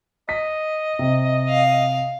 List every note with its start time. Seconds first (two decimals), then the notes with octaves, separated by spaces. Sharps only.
0.29 D#5 B6
0.99 C3
1.49 F5